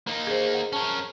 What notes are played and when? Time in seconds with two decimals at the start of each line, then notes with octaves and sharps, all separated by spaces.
0.07 A#3 D#4
0.27 G#4 C5
0.54 F#5
0.73 C#4 A#4 A5